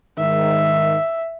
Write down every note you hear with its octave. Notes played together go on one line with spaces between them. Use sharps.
G#2 D#3 E5